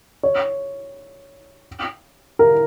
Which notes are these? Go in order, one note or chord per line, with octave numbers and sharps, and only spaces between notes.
C#5
A#4